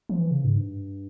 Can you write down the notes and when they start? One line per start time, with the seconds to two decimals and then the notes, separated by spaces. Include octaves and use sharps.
0.09 F3
0.19 E3
0.31 C#3
0.44 G#2
0.57 G2